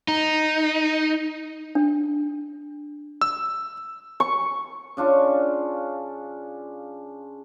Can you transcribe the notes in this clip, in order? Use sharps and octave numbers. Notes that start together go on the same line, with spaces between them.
D#4
D4
E6
C#6
C#3 D4 F4 C#5